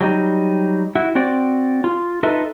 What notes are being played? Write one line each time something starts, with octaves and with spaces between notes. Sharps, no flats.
F#3 G3 D#4
E4 F#4
C4 F#4 D5
F4
D#4 F4 A4 B4 D#5 E5